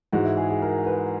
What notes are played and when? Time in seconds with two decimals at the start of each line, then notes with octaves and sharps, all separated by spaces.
0.12 G#2 E3 F#4
0.25 E4
0.37 G#4
0.50 G#4
0.62 A#4
0.86 B4